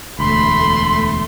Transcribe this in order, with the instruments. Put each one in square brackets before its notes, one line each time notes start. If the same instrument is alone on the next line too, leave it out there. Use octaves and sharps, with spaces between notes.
[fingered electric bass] E1 D2 [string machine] A3 [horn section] B5 [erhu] C6